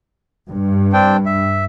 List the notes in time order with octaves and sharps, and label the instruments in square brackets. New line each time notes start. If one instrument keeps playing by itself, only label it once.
[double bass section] G2
[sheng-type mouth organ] C4 D4 G5
E5